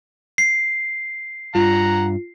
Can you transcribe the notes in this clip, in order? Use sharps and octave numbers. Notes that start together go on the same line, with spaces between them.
C7
G2 F4 F#5 A#5